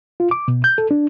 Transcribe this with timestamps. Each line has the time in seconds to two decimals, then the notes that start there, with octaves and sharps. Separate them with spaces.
0.20 F4
0.31 D6
0.48 B2
0.64 G6
0.78 A4
0.91 D4